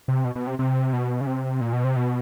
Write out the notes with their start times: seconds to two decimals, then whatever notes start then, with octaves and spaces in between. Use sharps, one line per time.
0.08 C3
0.25 B2
0.35 B2
0.47 C3
0.59 C3
0.93 B2
1.21 C#3
1.27 C3
1.61 A#2
1.73 B2
1.84 C3
1.96 B2